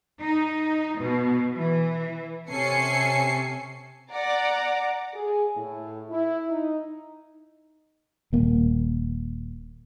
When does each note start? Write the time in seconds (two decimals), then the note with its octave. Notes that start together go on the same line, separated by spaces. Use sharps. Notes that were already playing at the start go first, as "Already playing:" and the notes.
0.21 D#4
0.99 B2
1.54 E3
2.49 C3 C#4 A4 G#5 C7 C#7
4.11 D5 F#5 A#5 D6
5.14 G#4
5.57 A2
6.10 E4
6.50 D#4
8.33 D#1 A#3